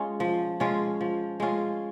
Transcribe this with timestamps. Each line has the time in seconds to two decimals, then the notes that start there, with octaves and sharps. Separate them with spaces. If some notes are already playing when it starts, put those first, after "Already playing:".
Already playing: G#3 C#4 F4
0.20 F3
0.60 G#3 C#4 F4
1.01 F3
1.40 G#3 C#4 F4